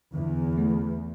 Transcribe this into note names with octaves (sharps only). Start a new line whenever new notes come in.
E2 D3
A3